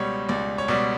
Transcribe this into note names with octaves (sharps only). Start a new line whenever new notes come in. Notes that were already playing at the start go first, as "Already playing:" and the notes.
Already playing: C#2 B2 G3 C#5
C#2 D5
C#5
B2 G3 D5